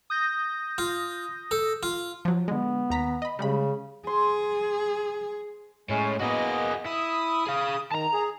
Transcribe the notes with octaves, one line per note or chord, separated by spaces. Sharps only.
D#6 G6 A#6
F4
A4
F4
F3 F#3
D3 G#3 B3
D#2 A#5 B6
D#5 B5
C#3 G3 G#3 B5
G#4 C6
A2 G#3 C#4
A#3 B3 F#4 G#4 D#5
E4 D#6
G#4 F5
D#3 A5 A#5
G#4